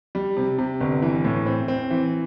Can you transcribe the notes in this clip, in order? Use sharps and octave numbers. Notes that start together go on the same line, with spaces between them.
G3
C3
C3
G1
E3
A2
C4
C4
E3